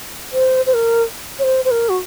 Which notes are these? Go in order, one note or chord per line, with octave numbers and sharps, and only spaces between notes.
C5
C5
A#4
C#5
C5
C5
A#4
F#4